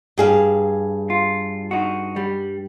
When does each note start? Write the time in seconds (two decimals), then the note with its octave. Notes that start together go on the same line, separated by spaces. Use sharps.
0.18 G2 G#4 F5
1.10 F4
1.71 D#4 F#4
2.16 G3